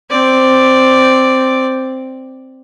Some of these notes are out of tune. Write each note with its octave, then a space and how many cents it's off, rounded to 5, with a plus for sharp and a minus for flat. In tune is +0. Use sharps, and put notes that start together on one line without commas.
C4 +0 D5 +0